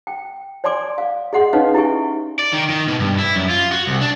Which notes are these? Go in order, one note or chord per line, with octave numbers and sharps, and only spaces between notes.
G5
C#5 D5 G#5 C6 D6
F5
G#4 D#5 F#5 C6
C#4 D#4 B4 C#5 D#5 F5
E4 G4 E5 G#5 C#6
D5
D#3
D#3
B2
G2
E4
F#2
F4
F#4
C2
D4